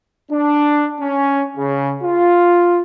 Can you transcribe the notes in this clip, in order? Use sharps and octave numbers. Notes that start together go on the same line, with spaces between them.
D4
C#4
C#3
F4